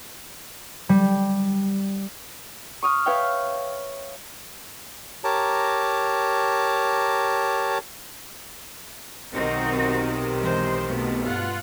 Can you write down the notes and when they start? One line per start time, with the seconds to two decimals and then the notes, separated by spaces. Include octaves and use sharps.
0.89 G3
2.82 C#6 D#6 F6
3.06 B4 C#5 E5 F5 G5
5.24 G4 A#4 C#5 A5 A#5 D6
9.32 B1 C3 D#3 C4 D#4 F#4
10.41 E3 G#3 C5
10.88 B2 A3 B3
11.25 G2 F4 F#5